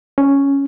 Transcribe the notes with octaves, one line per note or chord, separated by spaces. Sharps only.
C#4